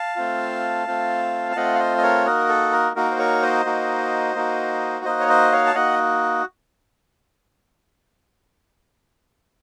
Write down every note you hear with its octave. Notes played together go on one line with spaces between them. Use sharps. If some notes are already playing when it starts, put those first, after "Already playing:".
Already playing: F5 A5
A3 C4 F4
A3 C4 F4
A5
A3 C4 F4 D#5 F#5
F5
C5 D#5
D#5
A#4 C#5
A#3 D#4 F#4 A#4
A4
A#4
A#3 D#4 F#4 A#4
C5
A#4 C#5
C5 D#5
A#3 D#4 F#4
A#3 D#4 F#4
A#3 D#4 F#4 C5 D#5
C#5
C5 D#5
C#5 F5
A5
A#3 D#4 F#4 D#5 F#5